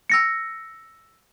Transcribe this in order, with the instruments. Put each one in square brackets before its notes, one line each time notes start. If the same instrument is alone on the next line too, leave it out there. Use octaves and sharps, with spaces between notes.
[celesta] E6 A#6 C#7